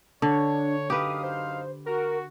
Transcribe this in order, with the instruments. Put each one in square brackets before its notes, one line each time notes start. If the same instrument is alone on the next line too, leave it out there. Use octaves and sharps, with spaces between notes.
[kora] D3 [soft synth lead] D4 [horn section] C#5
[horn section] F#2 D#4 F5 [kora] G4 B4 [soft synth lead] D#6
[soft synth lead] C5
[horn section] F#4 [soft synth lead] A#4